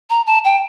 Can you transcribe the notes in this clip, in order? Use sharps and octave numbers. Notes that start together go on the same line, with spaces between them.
A#5
A5
G5